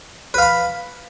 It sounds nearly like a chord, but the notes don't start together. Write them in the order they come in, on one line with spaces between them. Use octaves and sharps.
B4 F5 B5